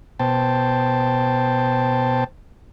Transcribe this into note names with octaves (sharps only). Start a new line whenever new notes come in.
B2 C5 G5 A5